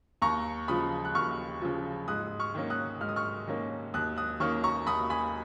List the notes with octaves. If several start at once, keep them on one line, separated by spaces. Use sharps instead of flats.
D#2 A#5 C#6
C#3 F3 B5 D#6
F#6
D#2 C#6 F6
C#3 F3
G#2 D#6 F#6
C#6 F6
D#3 A#3 C#4
D#6 F#6
G#2 F6
D#6
C#6 F6
D#3 A#3 C#4
D#2 D#6 F#6
D#6 F#6
D#3 A#3 C#4 C#6 F6
A#5 C#6
D#2 B5 D#6
G#5 B5